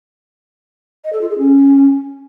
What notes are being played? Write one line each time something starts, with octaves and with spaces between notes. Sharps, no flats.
D#5
A4
F4
G#4
C#4